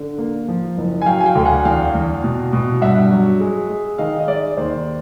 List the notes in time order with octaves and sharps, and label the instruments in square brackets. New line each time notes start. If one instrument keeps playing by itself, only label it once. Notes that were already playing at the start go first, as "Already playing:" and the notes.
Already playing: [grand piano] D3
A#3
F3
F#1
G#5
F#3 F5 G5
G#5
F5 G5
D2
F#5 G#5
E2 F5 G5
E2
B2
B2
G2 E5 F#5
F#3
G#3
G#3
D#3 D#5 F5
D#5
G#3 D5 E5
D#2 C5 D5